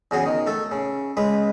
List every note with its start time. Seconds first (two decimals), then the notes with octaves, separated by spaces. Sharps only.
0.11 E2 C#3 F#4 G#4
0.26 D#3
0.47 A3 A4
0.72 C#3
1.17 C#2 G#3 B4